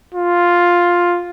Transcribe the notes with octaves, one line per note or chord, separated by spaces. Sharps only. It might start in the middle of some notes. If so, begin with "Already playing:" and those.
F4